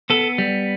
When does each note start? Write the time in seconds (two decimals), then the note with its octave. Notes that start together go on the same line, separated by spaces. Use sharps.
0.10 B3 A4
0.38 G3